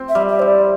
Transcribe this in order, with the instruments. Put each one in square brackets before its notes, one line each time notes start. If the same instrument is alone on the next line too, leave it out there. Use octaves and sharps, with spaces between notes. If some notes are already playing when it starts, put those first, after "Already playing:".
Already playing: [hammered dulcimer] C4
[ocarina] E5
[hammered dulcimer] G3
[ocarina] E5
[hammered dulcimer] E4 [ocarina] C5
[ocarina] D5